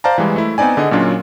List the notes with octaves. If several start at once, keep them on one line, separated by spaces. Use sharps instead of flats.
C5 D5 F5 A5 A#5
E3 G3 G#3
A3 E4
B3 C4 D#4 D5 G#5
D3 G#4 D#5
A#2 F#3 C#4 D4 F4